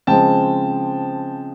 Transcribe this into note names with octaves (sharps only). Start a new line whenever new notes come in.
C#3 F3 G#3 C4 G5 A5